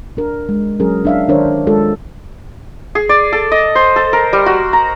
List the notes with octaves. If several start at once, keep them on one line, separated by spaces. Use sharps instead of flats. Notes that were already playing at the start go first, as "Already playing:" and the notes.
D4 A#4
G#3
F#3 C#4 G#4 A#4
D4 E5 F5
D#3 D4 A#4 C5 C#5
G#3 F4 A4
G#4
D5
A4
D#5
C5
A4
A#4
G3
F#4
A#5